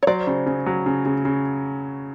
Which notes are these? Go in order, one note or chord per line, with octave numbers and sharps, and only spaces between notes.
C#5
F#3 C5 D5
C#3
C#3
F#3
C#3
C#3
C#3